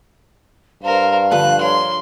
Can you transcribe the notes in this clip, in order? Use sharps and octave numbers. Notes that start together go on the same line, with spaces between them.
G2 A#4 C5 F5
D3 F3 B4 F#6
A#4 C#5 C6